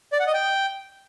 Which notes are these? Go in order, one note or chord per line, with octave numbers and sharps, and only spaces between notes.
D5
F#5
D#5
G5